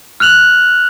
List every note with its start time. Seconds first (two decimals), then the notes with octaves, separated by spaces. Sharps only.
0.20 F6 F#6 F7 F#7